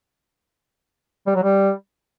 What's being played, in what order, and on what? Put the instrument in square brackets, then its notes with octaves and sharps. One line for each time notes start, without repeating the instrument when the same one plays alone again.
[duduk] G3
F#3
G3